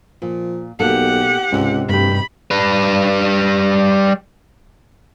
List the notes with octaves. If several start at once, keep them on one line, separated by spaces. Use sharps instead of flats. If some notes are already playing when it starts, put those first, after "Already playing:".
A#2 F3
B1 B2 A#3 G4 A4 F#5
C#2 G#2 C3
D1 G2 G4 B5
G3 B4